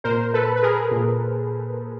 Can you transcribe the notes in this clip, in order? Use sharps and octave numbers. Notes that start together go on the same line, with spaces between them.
A#2 A#4 C5
A4 B4
B4
G#4 A#4
A#2